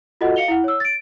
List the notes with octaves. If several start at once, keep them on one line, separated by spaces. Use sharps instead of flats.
F4 F#4 A4 D#5 F#5
F5 C#7 F7 G7
E4 F#5
C#5 E6
A6 D7